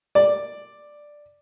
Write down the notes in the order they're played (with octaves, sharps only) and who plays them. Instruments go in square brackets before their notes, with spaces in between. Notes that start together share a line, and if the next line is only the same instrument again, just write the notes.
[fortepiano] D5